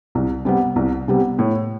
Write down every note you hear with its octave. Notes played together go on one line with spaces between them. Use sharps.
C2
C3 G3 B3
C2
C3 G3 B3
A2